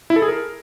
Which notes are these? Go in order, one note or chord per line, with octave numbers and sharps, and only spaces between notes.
E4
A4
G#4
A#4